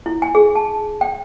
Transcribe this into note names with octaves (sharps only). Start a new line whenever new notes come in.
E4
G#5
G#4
A5
G5